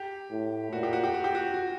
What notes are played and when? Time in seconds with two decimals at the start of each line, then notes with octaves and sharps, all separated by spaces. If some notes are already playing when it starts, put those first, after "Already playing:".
Already playing: G4
0.31 A2
0.72 A#2 F#4
0.83 G4
0.93 F#4
1.04 G4
1.14 F#4
1.24 G4
1.35 F#4
1.54 F#4